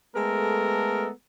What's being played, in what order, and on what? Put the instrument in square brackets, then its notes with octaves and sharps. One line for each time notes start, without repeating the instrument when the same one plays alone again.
[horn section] G#3 A3 B3 A4 A#4